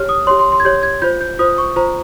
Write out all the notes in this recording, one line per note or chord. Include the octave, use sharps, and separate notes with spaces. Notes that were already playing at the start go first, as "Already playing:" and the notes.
Already playing: G4 C#5 F6
D#6
G4 C#5 C6
C6
C6
G#6
G4 C#5 G6
G#6
F4 C5 G6
G6
F4 C5 D#6
C#6
F4 C5 A#5